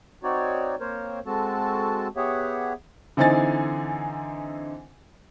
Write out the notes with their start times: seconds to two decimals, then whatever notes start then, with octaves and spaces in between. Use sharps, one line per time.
0.23 C4 D#4 F#4 C#5 D5
0.80 A#3 C4 A#4 C5 C#5
1.26 G#3 C4 F#4 A4 A5
2.16 B3 G4 G#4 C#5 E5 F#5
3.17 D3 E3 C4 D#4 G#5 A6